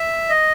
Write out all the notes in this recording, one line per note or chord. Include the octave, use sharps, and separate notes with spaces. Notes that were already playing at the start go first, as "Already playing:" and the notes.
Already playing: E5
D#5